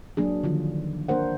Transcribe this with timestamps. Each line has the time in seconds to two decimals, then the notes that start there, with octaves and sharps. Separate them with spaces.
0.17 F#3 A#3 D4 G#4
0.44 D3 D#3 F3 F4
1.08 A#3 D4 A#4 C5 F#5